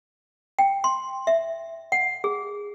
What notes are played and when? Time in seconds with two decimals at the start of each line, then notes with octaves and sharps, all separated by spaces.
0.59 G5
0.84 C6
1.27 E5
1.92 F#5
2.24 G#4